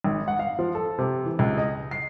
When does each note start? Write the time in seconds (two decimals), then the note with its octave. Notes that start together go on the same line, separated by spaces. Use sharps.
0.04 G#1
0.28 F#5
0.39 F5
0.59 F3
0.75 A4
0.98 C3
1.25 E3
1.39 C#2
1.58 D#5
1.91 C7